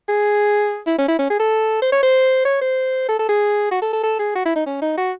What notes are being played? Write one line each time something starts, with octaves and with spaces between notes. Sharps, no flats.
G#4
E4
C#4
E4
C#4
G#4
A4
C5
C#5
C5
C#5
C5
A4
A4
G#4
F#4
A4
A4
A4
G#4
F#4
E4
D#4
C#4
D#4
F#4